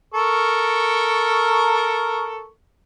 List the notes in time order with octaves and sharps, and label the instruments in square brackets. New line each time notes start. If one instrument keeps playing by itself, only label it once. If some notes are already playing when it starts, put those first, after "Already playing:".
[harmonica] A4 A#4 C#6